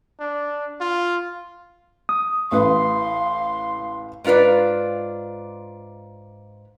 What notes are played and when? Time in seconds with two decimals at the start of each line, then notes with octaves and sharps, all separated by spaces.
0.20 D4
0.81 F4
2.09 D#6
2.52 A1 A2 B4 F5 C6
4.24 G#2 D4 F4 B4 D5